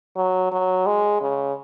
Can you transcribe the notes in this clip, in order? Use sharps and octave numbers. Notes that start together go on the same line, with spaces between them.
F#3
F#3
G#3
C#3